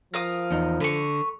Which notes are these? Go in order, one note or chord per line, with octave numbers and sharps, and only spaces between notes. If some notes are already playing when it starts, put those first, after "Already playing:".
F3 A#4 F5 D#6
E2 D#4
D3 B4 C#6